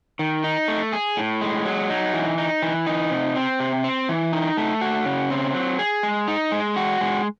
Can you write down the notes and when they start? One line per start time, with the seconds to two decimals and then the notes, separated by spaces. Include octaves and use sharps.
0.19 D#3
0.44 D#4
0.68 A3
0.93 G#4
1.17 A2
1.41 G#3
1.65 F#3
1.90 D#4
2.14 E3
2.38 D#4
2.63 E3
2.87 D#4
3.11 C3
3.36 C4
3.60 C3
3.84 C4
4.09 E3
4.33 D#4
4.57 A3
4.81 F#4
5.06 C#3
5.30 C4
5.54 F#3
5.79 G#4
6.03 G#3
6.28 D#4
6.52 G#3
6.76 F#4
7.01 G#3